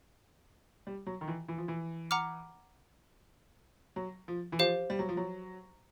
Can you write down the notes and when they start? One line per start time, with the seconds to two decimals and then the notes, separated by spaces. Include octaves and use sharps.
0.87 G3
1.07 F#3
1.21 D#3
1.28 E3
1.48 E3
1.58 F3
1.68 E3
2.11 F#5 A#5 D6 F6
3.96 F#3
4.28 F3
4.52 E3
4.59 F3 G4 C5 F5
4.90 G3
4.99 F#3
5.09 F3
5.17 F#3